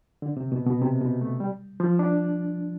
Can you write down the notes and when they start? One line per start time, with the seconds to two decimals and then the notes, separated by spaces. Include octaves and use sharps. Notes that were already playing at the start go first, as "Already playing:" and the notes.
0.22 D3
0.37 C3
0.52 B2
0.66 B2
0.82 C3
1.01 B2
1.21 A3
1.40 G3
1.80 F3
1.99 D4